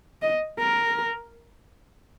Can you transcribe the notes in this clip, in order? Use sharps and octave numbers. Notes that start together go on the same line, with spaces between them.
D#5
A#4